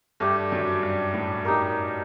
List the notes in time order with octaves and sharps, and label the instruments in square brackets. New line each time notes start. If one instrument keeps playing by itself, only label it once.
[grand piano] G2 [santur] A3 D4 G4
[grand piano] F#2
G2
A2
[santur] D#4 G4 A#4